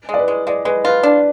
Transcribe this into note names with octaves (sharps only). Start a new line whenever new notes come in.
G#3 D5
B4
G#3
G#3 D5
G#3 B4
F4 B4
D4